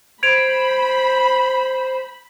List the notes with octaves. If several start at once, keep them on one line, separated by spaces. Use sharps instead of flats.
C5 B5 G#6 D7 F7